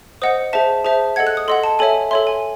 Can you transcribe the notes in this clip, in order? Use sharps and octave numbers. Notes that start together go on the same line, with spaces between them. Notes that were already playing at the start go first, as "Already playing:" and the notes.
C5 D#5 F#5 D#6
G#4 C5 E5 A5
G#4 C5 E5 A5
A4 D#5 F#5 G#6
F#6
D#6
A4 D#5 F#5 C6
A5
A4 C#5 E5 G#5
A4 C#5 E5 C6
G#5